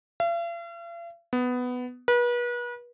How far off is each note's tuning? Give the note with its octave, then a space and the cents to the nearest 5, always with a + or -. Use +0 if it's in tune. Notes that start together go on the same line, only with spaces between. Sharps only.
F5 -45
B3 +10
B4 -35